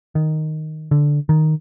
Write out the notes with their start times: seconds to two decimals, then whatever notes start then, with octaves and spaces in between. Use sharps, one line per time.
0.15 D#3
0.91 D3
1.29 D#3